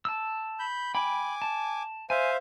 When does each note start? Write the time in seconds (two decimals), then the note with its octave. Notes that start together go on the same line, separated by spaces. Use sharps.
0.05 A5 E6
0.59 B5 G6
0.95 G5 G#5 B5 D6
1.42 A5
2.10 C5 E5 F5 G#5